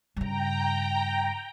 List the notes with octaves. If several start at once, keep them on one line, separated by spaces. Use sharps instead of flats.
G2 C#3 G5 A#5